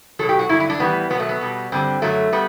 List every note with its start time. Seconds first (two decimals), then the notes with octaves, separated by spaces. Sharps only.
0.19 B2 F#3 A4
0.29 G4
0.39 F#4
0.49 G2 D3 F#3 E4
0.60 E4
0.70 D4
0.80 A2 E3 G3 B3
1.10 B2 F#3 B3
1.20 A3
1.29 B3
1.41 B2 G3
1.72 G2 D3 G3 C4
2.02 F#2 D3 F#3 A3
2.32 G3 B3